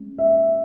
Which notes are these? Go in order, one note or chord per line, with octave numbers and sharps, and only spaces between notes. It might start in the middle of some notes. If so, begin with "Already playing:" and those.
Already playing: G#3 C#4
E5